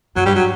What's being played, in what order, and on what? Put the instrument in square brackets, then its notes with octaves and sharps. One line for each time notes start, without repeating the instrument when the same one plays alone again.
[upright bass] F#2 [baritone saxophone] F#3
[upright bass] G2 [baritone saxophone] G3
[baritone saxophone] F#3